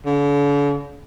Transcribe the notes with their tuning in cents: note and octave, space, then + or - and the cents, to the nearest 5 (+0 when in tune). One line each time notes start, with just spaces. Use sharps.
D3 -45